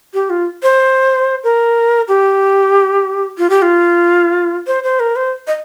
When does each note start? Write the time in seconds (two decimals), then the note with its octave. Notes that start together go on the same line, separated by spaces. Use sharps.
0.14 G4
0.30 F4
0.63 C5
1.44 A#4
2.08 G4
3.38 F4
3.50 G4
3.62 F4
4.67 C5
4.84 C5
5.00 A#4
5.16 C5
5.47 D#5